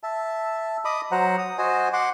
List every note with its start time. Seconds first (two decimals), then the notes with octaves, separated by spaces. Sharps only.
0.03 E5 A5
0.85 D#5 B5 D6 D#6
1.12 F#3 C5 F#5 A#5
1.38 D#6
1.58 F#4 C5 D#5 G#5
1.93 F#5 C6 D6